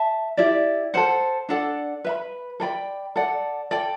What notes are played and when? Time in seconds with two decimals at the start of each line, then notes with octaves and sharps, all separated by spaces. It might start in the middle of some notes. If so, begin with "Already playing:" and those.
Already playing: E5 A5
0.37 E4 G4 D5
0.94 A4 C5 F#5
1.49 D4 A4 D5 F#5
2.04 B4 E5 B5
2.60 A4 D5 G5 B5
3.16 A4 D5 F#5
3.71 A4 D5 G5